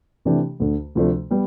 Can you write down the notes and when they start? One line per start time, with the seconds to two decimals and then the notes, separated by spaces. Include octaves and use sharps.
0.25 C3 E3 A3 D4 G4
0.60 D2 D3 A3
0.95 D2 C3 F3 A3 D4
1.31 G3 B3